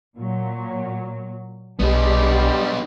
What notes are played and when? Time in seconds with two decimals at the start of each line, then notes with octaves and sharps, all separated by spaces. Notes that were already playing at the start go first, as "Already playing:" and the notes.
0.17 A#2 F#3
1.79 B1 G3 B3 D4 D#4 G4 G#4